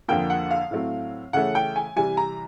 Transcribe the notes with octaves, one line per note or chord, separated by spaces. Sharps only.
F2 D3 F3 A#3 G5
F#5
F5
A2 F#3 A3 C4
C#3 E3 A3 C#4 F#5
G5
G#5
C3 E3 G3 G#5
A#5